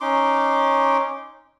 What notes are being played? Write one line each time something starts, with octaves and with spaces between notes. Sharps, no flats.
C#4 D#4 C6 D6